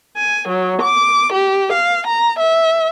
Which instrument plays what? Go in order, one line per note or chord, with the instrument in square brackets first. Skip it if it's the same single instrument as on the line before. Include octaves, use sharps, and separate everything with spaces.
[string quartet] G#5
F#3
D6
G4
F5
A#5
E5